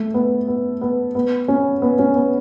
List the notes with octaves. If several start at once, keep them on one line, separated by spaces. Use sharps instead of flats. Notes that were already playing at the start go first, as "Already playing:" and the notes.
Already playing: A3
B3
B3
B3
B3
C#4
B3
C#4
B3